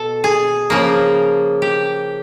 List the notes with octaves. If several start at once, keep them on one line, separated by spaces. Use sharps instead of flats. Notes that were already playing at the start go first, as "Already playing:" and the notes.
Already playing: B2 A4
G#4
C#3 F3 A#3
G4